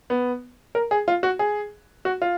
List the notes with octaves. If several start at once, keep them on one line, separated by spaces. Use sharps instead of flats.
B3
A#4
G#4
F4
F#4
G#4
F#4
F4